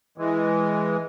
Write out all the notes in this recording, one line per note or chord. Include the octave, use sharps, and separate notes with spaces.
E3 G#3